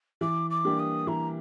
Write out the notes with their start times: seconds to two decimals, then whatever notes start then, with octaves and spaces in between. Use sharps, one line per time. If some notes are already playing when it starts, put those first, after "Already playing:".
0.21 E3 D6
0.50 D6
0.65 G3 A#3 D4 G4
0.79 D#6
1.07 E3 A#5